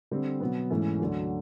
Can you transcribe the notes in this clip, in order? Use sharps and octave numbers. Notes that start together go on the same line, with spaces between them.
D3 G3 C4
B2 F#3 B3
G#2 E3 A3 C#4
D2 D3 F#3